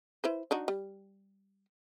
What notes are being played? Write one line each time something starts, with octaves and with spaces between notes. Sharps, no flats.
E4 B4 C5
D4 D#4 F#4
G3